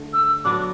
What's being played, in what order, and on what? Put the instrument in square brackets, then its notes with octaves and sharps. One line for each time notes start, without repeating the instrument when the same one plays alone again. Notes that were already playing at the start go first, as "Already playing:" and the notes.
Already playing: [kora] D3 A3
[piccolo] E6
[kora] F#3 B3 D4 [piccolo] D6